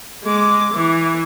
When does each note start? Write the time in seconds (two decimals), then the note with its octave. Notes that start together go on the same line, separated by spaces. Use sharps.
0.23 G#3 D6
0.73 E3